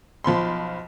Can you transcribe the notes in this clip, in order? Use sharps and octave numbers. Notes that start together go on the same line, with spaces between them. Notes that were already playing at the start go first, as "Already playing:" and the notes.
B1 F3 B5 C6